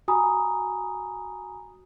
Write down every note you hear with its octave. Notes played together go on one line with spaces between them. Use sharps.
F#4 G#5 A#5 B5 D#6